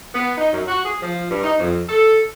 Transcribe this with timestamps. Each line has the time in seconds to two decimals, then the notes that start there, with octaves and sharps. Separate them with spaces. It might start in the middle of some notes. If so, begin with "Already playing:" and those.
0.14 B3
0.38 D#4
0.53 F#2
0.67 F#4
0.85 G#4
1.01 F3
1.31 G2
1.44 D#4
1.60 F2
1.89 A4